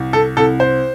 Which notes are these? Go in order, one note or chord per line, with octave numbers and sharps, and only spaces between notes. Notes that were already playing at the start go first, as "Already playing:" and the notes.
Already playing: C2
A4
C2 A4
C5